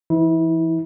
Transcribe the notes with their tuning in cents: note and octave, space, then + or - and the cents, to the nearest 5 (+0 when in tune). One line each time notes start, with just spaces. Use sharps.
E3 +25 E4 -30